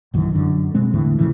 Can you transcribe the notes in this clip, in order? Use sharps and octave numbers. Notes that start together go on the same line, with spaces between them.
A#1 F#2 D#3 E3
F#2 D3
B2 G#3 C4
E2 A2 D3 E3
A2 C#3 E3 F3